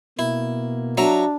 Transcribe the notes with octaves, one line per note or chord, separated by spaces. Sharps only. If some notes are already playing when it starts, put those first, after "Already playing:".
B2 A#3 E4
F#3 D4 E5 A#5